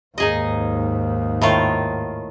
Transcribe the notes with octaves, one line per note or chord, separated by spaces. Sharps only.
D#2 G#2 D#4 G#4 D#5
A2 D#3 F4